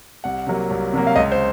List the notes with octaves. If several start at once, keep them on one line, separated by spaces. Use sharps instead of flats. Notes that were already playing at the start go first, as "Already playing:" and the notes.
C2 F#5
C3 F#3 A#3
C2
C3 F#3 A#3
F5
C#2 D#5
C5